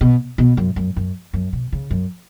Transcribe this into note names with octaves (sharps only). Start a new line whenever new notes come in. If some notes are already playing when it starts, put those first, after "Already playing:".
B2
B2
F#2
F#2
F#2
F#2
B2
C#3
F#2